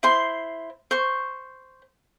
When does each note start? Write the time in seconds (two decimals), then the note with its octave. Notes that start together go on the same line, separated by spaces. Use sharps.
0.03 E4 C5 C6
0.91 C5 C#6